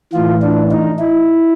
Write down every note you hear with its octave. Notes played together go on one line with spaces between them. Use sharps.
A2 E3 F4
D4
D#4
E4